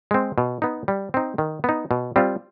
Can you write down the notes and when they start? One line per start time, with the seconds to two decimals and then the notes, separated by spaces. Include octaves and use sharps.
0.11 G#3 C4
0.38 B2
0.62 B3 D#4
0.88 G3
1.14 C4 D#4
1.38 D#3
1.64 B3 D#4
1.91 B2
2.16 G3 C4 F4